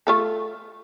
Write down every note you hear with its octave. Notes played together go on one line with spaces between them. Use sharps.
A3 F4 A4